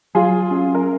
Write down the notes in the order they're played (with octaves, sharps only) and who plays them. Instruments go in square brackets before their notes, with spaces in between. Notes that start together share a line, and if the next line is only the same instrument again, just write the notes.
[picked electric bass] F#3 [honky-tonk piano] F4 G#4
[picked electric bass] C#4
[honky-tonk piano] A#4